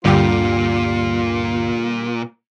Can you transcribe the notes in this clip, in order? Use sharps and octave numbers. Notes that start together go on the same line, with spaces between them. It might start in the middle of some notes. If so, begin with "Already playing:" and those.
D2 G2 A#2 D3 G3 F4 G4